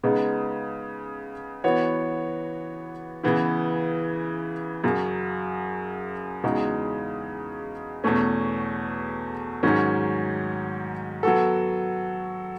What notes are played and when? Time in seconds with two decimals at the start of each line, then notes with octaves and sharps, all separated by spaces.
0.03 C#3 G#3 B3 D#4
1.64 E3 B3 F#4 C#5
3.24 C#3 E3 B3 E4
4.84 F#2 C#3 F#3
6.44 E2 C#3 G#3 D#4 F#4
8.04 E2 B2 A3 C#4
9.63 G#2 D#3 F#3 C#4
11.23 F#3 B3 F#4 A4